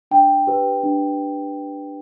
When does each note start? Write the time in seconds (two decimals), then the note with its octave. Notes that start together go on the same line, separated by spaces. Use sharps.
0.11 D4 G5
0.47 G4 B4
0.83 D4